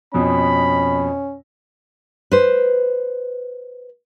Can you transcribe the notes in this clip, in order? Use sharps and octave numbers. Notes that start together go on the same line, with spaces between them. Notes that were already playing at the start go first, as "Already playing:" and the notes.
F2 B2 C#4 B5
B4 C5